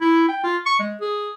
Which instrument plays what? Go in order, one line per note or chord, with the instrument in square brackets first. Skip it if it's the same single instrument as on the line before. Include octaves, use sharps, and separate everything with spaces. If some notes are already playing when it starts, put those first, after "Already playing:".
[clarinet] E4
G5
F4
C#6
G#3
G#4